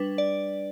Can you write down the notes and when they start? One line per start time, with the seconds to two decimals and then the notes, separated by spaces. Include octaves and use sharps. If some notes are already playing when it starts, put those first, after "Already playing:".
Already playing: G3 D4 B4
0.18 D5